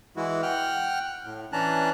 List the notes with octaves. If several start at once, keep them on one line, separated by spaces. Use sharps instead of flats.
E3 G#3 E4 F#4
F#5 G5 F6 F#6
A2
E3 C#4 D4 A5 A#5 F#6